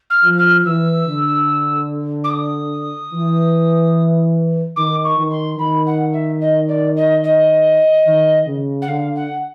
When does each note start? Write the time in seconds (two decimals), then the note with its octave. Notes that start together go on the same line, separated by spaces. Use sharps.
0.10 F6
0.24 F3
0.38 F6
0.65 E3 E6
1.06 D3
2.24 D6
2.30 D#6
3.12 E3
4.76 D#3 D6
5.04 C#6
5.17 D#3
5.31 C6
5.58 D#3 B5
5.86 F#5
6.13 E5
6.41 D#5
6.68 D5
6.96 D#5
7.24 D#5
8.06 D#3
8.46 C#3
8.82 F#5
8.88 D3 F5
9.15 F#5